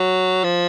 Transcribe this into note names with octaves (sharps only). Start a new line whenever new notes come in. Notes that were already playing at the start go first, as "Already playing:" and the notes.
Already playing: F#3
F3